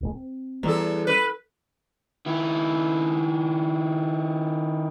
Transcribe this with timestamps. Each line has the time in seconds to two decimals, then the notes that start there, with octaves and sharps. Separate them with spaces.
0.01 D1 A#2 G#3
0.13 C4
0.63 E2 G3 A4
1.07 B4
2.26 D#3 E4